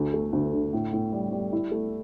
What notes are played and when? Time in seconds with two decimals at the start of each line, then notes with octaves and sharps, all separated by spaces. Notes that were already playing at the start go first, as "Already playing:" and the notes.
Already playing: D2
0.14 A3
0.33 D2
0.53 D3
0.73 A2
0.93 A2
1.12 G3
1.32 G3
1.53 E4
1.72 A3